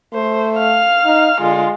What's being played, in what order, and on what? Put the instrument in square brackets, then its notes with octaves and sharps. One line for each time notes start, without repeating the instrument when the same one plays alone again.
[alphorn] A3 [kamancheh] C5
[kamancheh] F5 F6
[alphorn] D#4
[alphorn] D3 [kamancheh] G#3 F4